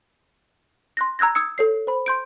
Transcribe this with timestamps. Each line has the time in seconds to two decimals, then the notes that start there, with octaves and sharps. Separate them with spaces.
0.97 C6 F#6 A#6
1.19 A#5 E6 F#6 G#6 A#6
1.35 D#6 E6 G#6 C#7
1.58 A4 C#5 C7
1.87 C5 B5
2.06 C6 G6 D7